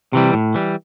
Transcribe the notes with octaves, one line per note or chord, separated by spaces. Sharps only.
C3 E3 G3
A2
E3 G3